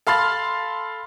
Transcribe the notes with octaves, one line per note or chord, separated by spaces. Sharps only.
A4 F5 B5 C6 F6 A6